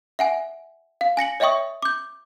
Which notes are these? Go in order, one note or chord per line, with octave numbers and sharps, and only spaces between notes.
E5 F#5 G#5
F5
G#5 A#6 C#7 F#7
C#5 D#5 E5 G5 C#6 D#6
D6 G6